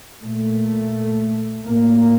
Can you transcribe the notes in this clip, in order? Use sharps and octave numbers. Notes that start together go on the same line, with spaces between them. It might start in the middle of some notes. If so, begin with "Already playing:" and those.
A#2 A3
A2 A#3